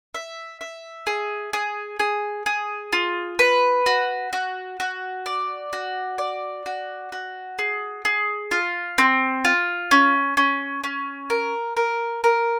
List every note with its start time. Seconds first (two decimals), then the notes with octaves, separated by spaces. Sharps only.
0.15 E5
0.61 E5
1.07 G#4
1.53 G#4
1.99 G#4
2.46 G#4
2.93 F4
3.39 B4
3.86 F#4
4.33 F#4
4.80 F#4
5.26 D5
5.73 F#4
6.18 D5
6.66 F#4
7.12 F#4
7.59 G#4
8.05 G#4
8.51 F4
8.98 C4
9.45 F4
9.91 C#4
10.37 C#4
10.84 C#4
11.30 A#4
11.77 A#4
12.24 A#4